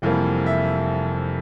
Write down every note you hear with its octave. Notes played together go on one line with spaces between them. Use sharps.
F1 F2 E3 G3 A#3
E5